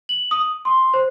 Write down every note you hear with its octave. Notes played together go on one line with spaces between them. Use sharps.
F#7
D#6
C6
C5